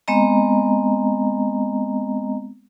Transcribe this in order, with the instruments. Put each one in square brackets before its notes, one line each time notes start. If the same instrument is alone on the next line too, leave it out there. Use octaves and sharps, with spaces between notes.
[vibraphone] G#3 B3 C4 D#5 A#5